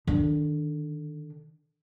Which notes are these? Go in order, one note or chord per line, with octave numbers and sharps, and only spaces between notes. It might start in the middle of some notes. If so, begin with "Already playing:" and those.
D3 D#3